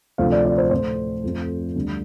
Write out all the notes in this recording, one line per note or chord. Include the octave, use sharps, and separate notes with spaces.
D2 C3 F3 C5 F5
D5
D5
C5
A2 F3 A3 C5
F2 F3 A3
D2 D3 G3